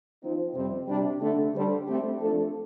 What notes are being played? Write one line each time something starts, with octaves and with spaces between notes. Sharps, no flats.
F3 C4 D#4
F2 C3 G3 C4
C3 G3 D4 G4
D3 A3 D4
D3 G3 D4 A4 C5
A3 C4 G4
F3 A3 D4 A4